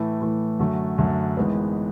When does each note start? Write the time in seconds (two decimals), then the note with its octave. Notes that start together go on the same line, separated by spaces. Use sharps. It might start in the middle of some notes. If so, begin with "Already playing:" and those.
Already playing: A2 E3 A3
0.21 A2 E3 A3
0.59 F#2 D3 F#3 A3
0.98 F#2 D3 F#3 A3
1.37 G#1 G#2 E3 G#3 B3